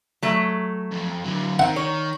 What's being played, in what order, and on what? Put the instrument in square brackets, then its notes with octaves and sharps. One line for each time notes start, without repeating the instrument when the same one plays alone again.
[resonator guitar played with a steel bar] F#3 A3
[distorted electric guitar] F2
D3 F#3
[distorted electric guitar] D#3 [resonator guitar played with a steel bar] C4 [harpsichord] F#5
[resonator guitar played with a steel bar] C#5